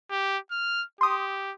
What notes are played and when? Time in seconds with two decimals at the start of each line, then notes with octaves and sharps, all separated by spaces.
0.11 G4
0.51 F6
1.01 G4 C6 D#6